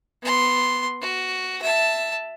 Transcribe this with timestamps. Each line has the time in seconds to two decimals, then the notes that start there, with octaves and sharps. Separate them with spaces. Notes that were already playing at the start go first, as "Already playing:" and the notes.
0.23 B3 C6
1.01 F#4
1.62 E5 A5